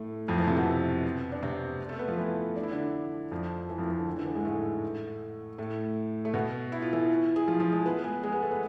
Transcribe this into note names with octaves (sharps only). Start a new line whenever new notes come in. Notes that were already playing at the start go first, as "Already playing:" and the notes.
Already playing: A2 A3
F2 F3
E3
C3 C4
B2 B3
D4
C3 C4
A3 A4
B3 B4
F3 F4
E3 E4
D4
E4
D3 D4
F2 F3
E3
F2 F3
E3
D3
E3
D3
E3
G#2 G#3
A2 A3
A2 A3
A3
B2 B3
E4
F4
E3 E4
G#4
F3 F4
F3 F4
G#3 G#4
B3 B4
G#3 G#4
G#3 G#4
B3 B4
A3 A4
B3 B4